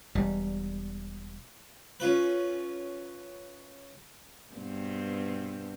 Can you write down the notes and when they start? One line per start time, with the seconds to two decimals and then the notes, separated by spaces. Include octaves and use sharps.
0.15 E1 G3
2.00 C#4 F4 B4
4.54 G2 B2 C4